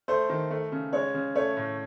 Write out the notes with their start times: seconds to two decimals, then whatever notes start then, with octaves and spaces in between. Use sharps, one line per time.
0.08 A3 C5
0.30 D#3
0.51 A3
0.72 C#3
0.93 G#3 C#5
1.14 C#3
1.35 A3 C#5
1.57 A2